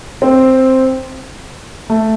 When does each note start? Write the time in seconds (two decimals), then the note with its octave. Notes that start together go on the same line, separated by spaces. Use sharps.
0.22 C4
1.90 A3